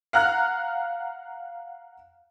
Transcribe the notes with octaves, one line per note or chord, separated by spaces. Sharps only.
F5 F#5 A#5 F6 F#6